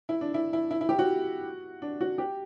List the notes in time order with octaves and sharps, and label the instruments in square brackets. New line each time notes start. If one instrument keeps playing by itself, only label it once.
[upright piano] E4
D4
E4
E4
E4
E4
G4
F#4
D4
F#4
G4